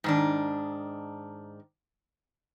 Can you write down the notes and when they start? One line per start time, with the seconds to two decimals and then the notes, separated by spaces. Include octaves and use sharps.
0.04 G#2 D#3 D4